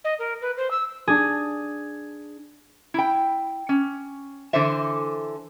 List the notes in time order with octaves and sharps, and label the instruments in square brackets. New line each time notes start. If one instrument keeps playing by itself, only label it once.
[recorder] D#5
A#4
B4
C5
E6
[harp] D4 G#4
[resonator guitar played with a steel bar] E4 G5
C#4
D3 E3 A4 C5 E5